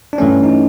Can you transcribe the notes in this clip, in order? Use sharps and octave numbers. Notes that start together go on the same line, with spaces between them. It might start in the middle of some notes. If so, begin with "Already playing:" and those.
D4
G2 E3 A3 C#4
D#4